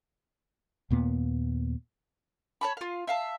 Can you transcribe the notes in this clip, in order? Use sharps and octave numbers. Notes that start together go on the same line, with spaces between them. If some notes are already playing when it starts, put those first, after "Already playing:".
D#2 A#2 A#3 B3
C#5 A5 B5
F4 F5
E5 F5 A5